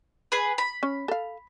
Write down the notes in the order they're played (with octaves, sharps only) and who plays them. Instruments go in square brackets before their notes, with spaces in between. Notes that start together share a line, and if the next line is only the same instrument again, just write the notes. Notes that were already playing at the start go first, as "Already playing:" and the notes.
[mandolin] G#4 B4
B5
[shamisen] C#4
A4 F5